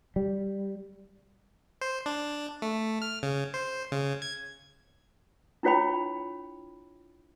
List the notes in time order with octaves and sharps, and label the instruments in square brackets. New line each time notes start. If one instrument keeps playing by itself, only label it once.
[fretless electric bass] G3
[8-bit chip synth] C5
D4
A3
F6
C#3
C5
C#3
G#6
[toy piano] D4 E4 F4 C#5 G5 B5